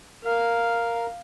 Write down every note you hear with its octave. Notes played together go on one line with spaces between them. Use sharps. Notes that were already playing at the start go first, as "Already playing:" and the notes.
A#4 F5